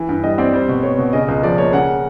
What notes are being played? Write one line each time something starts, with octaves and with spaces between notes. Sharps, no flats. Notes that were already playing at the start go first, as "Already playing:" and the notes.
Already playing: E3
G2
G3 D#5
C4 D5
G3 C5
B2
B3 C#5
B2
C#3 D#5
C#2
F3 D5
A#3 C#5
C#3 F#5